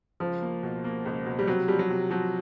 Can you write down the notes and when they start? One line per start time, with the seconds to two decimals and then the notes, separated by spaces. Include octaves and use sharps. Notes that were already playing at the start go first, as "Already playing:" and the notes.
0.20 C#2 F3
0.42 A#3
0.63 B2
0.84 A#3
1.05 C#2
1.26 B2
1.39 G3
1.47 C3 F#3
1.68 F3 G3
1.79 F#3
1.90 C3
2.10 F3 F#3